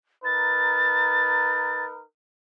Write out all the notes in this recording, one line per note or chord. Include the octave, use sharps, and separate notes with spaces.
D#4 A#4 B4 A6